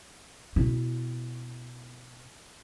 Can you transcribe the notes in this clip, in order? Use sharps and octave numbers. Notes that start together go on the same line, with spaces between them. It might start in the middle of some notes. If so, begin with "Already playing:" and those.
B2 E4